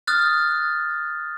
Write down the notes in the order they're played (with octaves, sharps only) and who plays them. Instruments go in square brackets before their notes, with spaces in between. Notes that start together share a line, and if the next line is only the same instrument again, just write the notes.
[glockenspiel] D#6 F6 F#6 A6